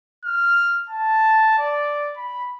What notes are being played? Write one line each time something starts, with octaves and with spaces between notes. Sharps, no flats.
F6
A5
D5
B5